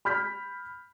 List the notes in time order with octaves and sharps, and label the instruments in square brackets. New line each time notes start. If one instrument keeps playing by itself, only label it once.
[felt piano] B5 F6 G6 B6